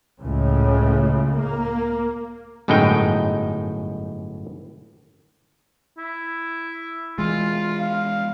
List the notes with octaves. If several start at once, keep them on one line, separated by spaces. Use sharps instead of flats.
C#2 A2 C#3
A#3
G1 F#2 A2 G#3 D#4 G5
E4
E3 G#3 F4
F5